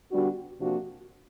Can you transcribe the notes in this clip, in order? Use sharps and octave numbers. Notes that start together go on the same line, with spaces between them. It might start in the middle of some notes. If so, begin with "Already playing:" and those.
D3 G3 B3 D4 F#4
C3 F3 A#3 D4 F#4